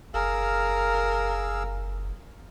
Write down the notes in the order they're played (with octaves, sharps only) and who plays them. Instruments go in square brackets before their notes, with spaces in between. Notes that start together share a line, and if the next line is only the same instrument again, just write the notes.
[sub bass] F#1 [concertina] G#4 F5 E6 [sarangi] A#4